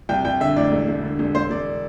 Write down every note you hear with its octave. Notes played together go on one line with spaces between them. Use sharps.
C2 G5
C2 G5
D3 E5
A1 D5
E1
E1
D3
E1
E1 C5
E1 D5